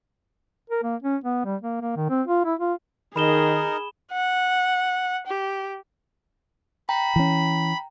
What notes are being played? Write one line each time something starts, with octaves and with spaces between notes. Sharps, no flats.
A#4
A#3
C#4
B3
G3
A#3
A#3
D#3
C4
F4
E4
F4
D#3 D#4 G#4 A#4 B5 E7 G7
F#5
G4
G5 A#5 B5
E3 C#4